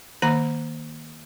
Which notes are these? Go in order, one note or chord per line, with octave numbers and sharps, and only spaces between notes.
D#3 A#3 A#5